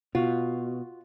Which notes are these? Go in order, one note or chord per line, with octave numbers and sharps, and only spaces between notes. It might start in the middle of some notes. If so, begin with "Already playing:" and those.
B2 F4 F#4